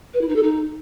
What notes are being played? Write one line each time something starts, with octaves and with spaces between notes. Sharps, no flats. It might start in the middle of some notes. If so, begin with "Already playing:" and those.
B4
E4
D#4
A4
D#4